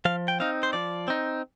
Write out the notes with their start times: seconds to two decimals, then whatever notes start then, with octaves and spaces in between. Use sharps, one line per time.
0.05 F3 F5
0.28 G5
0.40 C4 D#4 F5
0.63 C5
0.73 F3 D5
1.08 C4 D#4